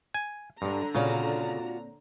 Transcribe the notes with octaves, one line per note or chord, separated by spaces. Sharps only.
G#5
G2 D3 G3 D4 A#5
A#2 C#3 C4 F4 F#4 C#5 D5